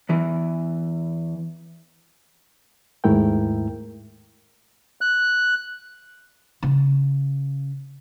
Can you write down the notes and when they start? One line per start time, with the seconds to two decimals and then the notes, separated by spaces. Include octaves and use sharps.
0.09 E2 E3
3.04 D#2 G#2 A3 E4 A#4 G5
5.01 F#6
6.63 C#3